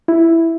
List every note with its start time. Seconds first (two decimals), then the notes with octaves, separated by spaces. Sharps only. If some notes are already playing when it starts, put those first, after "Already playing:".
0.08 E4